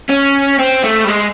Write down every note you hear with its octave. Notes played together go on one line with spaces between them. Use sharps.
C#4
C4
A3
G3
G#3